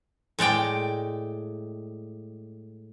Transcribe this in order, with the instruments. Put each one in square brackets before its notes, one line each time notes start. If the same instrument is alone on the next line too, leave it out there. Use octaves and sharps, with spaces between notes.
[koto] A2 G#3 D5 G5